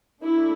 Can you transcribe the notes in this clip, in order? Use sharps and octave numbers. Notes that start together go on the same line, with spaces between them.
A3 D4 E4